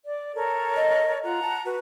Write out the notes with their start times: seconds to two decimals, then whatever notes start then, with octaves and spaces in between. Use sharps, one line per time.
0.06 D5
0.34 A4 A#4 C#5
0.76 D#5
1.24 F4 F#5 A#5
1.42 A5
1.65 F#4 B4